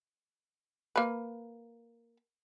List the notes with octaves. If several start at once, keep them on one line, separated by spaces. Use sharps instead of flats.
A#3 B4